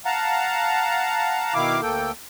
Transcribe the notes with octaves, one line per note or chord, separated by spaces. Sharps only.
F5 F#5 A5 A#5
B2 D#3 E4 F5 D6
D2 A#3 A4 G5